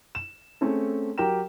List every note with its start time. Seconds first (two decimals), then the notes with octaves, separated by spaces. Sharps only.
0.15 E7
0.61 A3 C4 C#4 G#4 A4
1.18 F#3 G4 A#4 G5 A#5 E7